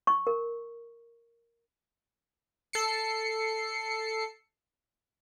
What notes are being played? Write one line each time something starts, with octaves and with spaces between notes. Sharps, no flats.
C#6
A#4
A4 C7 C#7